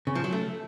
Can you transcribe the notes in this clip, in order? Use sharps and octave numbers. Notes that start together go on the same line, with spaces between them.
C#3
F3
F#3
A3